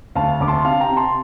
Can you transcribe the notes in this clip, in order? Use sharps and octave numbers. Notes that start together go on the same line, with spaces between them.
D2 F5 A5
D2 D6
A5 C6
C3 F5 A5
G5 A#5
C3
A5 C6